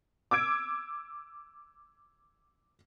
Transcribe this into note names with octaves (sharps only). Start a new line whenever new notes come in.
D6 E6 G#6 D7